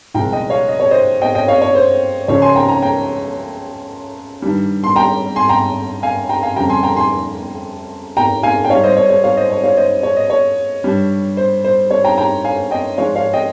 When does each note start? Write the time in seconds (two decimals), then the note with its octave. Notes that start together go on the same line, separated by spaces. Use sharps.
0.14 C2 A#2 F3 G#3 G5 A#5
0.32 D#5 G5
0.50 C#5 F5
0.68 D#5
0.80 C#5
0.91 C5 D#5
1.22 D#5 G5
1.35 D#5 G5
1.48 C#5 F5
1.62 C#5
1.75 C5
2.28 C#2 C#3 F3 C#5
2.42 G#5 C6
2.56 G5 A#5
2.69 G5 A#5
2.82 G5 A#5
4.42 G2 D#3 G3
4.84 C6
4.96 G5 A#5
5.36 G#5 C6
5.49 G5 A#5
6.03 F5 G#5
6.29 G5 A#5
6.43 F5 G#5
6.56 F2 C#3 G3 G5 A#5
6.69 G#5 C6
6.83 G5 A#5
6.96 G#5 C6
8.17 G5 A#5
8.43 F5 G#5
8.64 G5
8.70 G#2 G3 C#5 F5
8.84 C5 D#5
8.97 C#5
9.10 C#5
9.24 C#5 F5
9.37 C5 D#5
9.51 C#5
9.64 C#5 F5
9.77 C5 D#5
10.03 C#5
10.17 D#5
10.30 C#5
10.84 G2 G3
11.37 C5
11.65 C5
11.91 C#5
12.04 G5 A#5
12.18 G5 A#5
12.44 F5 G#5
12.71 D#5 G5
12.98 G#2 F3 G#3 C#5 F5
13.15 C#5 F5
13.33 D#5 G5